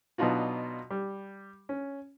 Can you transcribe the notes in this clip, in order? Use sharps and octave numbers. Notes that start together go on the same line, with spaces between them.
B2 F#3 D4 D#4 F4 F#4
G3
C#4